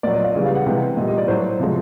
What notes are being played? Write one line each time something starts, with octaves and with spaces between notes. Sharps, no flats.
A#2 F#3 D5
D#5
F5
C#3 E3 G3
F5
F#5
C3 E3 G#3 G5
A#2 G3 D#5
D#5
D5
A2 F#3 C5
C3 F3 G#3